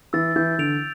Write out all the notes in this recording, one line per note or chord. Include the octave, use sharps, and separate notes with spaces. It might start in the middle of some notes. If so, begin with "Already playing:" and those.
E3 E6 A6
E3 G6
D3 D7 F7